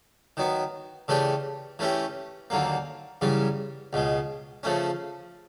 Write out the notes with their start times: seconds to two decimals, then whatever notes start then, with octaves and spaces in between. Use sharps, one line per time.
0.37 D#3 F#3 B3
1.08 C#3 E3 A3 D4 G4
1.79 E3 A3 C#4 E4 G4
2.50 D#2 D3 F#3 A#3
3.21 F#2 C#3 E3 G3
3.93 C#2 B2 G#3
4.63 C#3 F3 A3 C#4